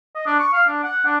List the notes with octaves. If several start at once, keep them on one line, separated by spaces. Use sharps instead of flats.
D#5
D4
C#6
F5
D4
F#5
D4